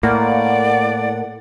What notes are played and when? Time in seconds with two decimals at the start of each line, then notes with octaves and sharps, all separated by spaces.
0.03 A2 A#3 D5 F#5